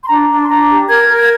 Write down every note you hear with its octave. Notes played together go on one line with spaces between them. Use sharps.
C6
D4 A#5
D4
C6
D4 A#5
G4
A#4 G#6
A#4
G#6